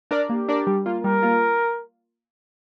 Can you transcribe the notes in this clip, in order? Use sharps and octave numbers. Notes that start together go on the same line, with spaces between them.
D4 A#4 D5
A#3 G4
D4 A#4 D5
G3
A#3 F4
G3 A#4
A#3 F4